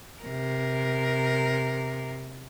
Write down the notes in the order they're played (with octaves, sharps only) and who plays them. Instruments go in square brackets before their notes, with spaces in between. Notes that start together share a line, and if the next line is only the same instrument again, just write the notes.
[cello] C3 A#4